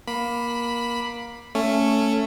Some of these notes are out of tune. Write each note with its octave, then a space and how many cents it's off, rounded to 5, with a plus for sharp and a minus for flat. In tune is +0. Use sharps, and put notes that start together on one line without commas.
A#3 +20 B5 +0
A3 +10 C#4 +0